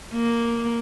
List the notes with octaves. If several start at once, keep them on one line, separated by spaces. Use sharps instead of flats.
A#3